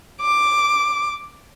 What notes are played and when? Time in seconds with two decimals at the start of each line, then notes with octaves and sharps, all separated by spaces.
0.21 D6